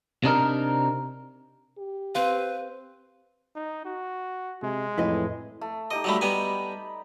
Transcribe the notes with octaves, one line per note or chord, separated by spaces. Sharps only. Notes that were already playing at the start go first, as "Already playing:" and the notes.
C3 D4 D#4 A#4
G4
C4 B4 C5 F5
D#4
F#4
C3 G#3
F2 A2 E3 E4 B4 D#5
A3
D#4 G4 D#5 D6
F#3 G3 A3 D#5 B5
G3 B3 G#5